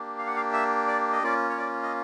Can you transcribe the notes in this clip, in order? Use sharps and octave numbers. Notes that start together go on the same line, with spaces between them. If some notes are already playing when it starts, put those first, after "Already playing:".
Already playing: A#3 D4 G4
F5
F#5
F5
E5
D5
D#5
A#3 C#4 F4 D5
C#5
D5
D#5